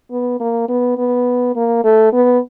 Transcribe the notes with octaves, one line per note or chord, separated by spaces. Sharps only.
B3
A#3
B3
B3
A#3
A3
B3